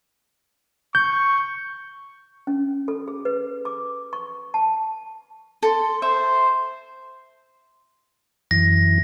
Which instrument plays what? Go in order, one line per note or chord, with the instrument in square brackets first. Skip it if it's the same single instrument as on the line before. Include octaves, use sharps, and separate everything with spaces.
[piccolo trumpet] C#6 [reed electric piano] G6
[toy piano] C#4
A4
G#4
B4
D6
C#6
A5
[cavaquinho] A4 C6
[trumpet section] C5 [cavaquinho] E5
[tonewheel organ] F#2 E3 [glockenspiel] A#6